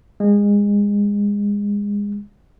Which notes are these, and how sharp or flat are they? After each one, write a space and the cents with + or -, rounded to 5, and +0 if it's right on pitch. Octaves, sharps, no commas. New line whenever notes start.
G#3 -25